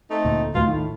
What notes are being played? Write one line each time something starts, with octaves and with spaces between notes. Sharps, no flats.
A3 C4 D#4
D2 A#2
A#1 D#2 B2 A3 F4
A2 D#3